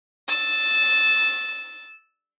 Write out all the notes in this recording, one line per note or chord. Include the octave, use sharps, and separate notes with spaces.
E6 A6